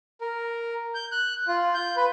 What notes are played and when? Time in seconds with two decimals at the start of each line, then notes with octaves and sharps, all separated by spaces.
0.21 A#4
0.95 G6
1.12 F#6
1.48 F4
1.74 G6
1.96 B4